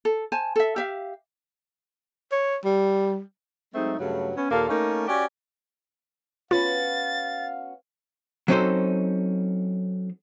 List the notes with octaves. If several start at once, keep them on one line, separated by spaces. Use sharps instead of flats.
A4
C5 G#5 A5
A4 E5
G4 E5 F5
C#5
G3
F#3 G#3 A3 C4 D#4
G2 C#3 F#3 A3 F#4
B3 C#4
D#2 A#2 A#3 A4 F5
A3 A#3 C#4 D#4 A#4
C#4 F#4 G4 D5
B3 C#4 F4 F#4 F5 A6
F#3 C4 C#4 D#4 A4 C5